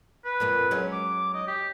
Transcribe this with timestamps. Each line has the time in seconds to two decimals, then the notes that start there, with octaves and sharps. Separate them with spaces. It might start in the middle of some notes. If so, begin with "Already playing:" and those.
0.25 B4
0.40 F2 A#2 A#3
0.71 F#3 G#3 C#4
0.93 D6
1.34 D#5
1.48 G4